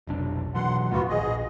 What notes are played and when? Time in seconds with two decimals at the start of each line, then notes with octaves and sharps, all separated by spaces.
0.07 F1 B1 D4
0.55 B2 E3 F#3 F#5 C6
0.91 E1 D#2 A2 B3 F4 F#4
1.09 A#1 G#4 D#5